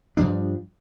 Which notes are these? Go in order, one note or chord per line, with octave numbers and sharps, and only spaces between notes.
G2 F3 G3 D4